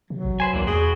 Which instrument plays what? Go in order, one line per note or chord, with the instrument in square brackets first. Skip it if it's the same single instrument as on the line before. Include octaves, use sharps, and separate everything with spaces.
[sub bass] C3 [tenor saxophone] F#3
[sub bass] A1
[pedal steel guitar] B4 C5 G#5
[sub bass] C#2 [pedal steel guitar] E3 A#3 D4
[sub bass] E2 [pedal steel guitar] F#4 B4 G5 [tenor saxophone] G#4